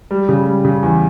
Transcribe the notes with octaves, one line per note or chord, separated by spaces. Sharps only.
G3
C#3
G3
C#3
E2